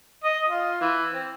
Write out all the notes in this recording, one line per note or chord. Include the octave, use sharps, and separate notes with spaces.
D#5
F4
E3
C4